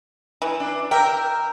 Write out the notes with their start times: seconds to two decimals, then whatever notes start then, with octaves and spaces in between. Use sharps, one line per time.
0.42 E3
0.60 D4
0.91 A#4 E5 G5